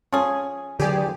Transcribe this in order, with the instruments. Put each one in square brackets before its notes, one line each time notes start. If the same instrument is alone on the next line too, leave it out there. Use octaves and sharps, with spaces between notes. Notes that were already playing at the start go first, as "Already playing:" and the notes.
[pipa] F3 G#4 [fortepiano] C#4
[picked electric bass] D3 F#3 [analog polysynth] G4 G#4 D5